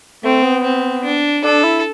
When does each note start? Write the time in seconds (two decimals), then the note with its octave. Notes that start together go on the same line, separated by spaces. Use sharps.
0.24 A3 C4
0.43 B3
0.64 C4
1.04 D4
1.44 D4 A4
1.64 E4